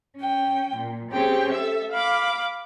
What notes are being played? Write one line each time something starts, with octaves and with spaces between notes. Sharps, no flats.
C#4 G5
A#2
C4 C#4 G4 G#4 C#5 G5
A4 E5
F5 B5 D6